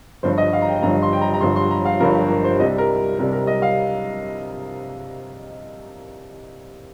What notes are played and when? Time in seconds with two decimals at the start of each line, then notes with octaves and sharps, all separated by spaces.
0.23 G1 G2 F3 C5
0.38 D#5
0.53 F5
0.62 A#5
0.67 G5
0.82 G1 G2 F3 A#5
1.03 C6
1.13 G5
1.21 A#5
1.34 A#5
1.41 G1 G2 F3 C6
1.56 C6
1.71 A#5
1.85 F5
2.00 G1 G2 F3 A#4
2.14 G4
2.30 A#4
2.44 C5
2.60 C2 C3 G3 D#5
2.78 A#4
3.19 C2 C3 G3 A#4
3.32 A#4
3.47 D#5
3.62 F5